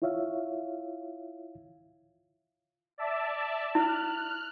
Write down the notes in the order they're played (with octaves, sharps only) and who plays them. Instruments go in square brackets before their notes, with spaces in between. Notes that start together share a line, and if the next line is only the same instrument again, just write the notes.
[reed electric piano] E4 F4 C#5 E5 F5
[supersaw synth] D5 E5 A5
[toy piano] E4 [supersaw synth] F6 F#6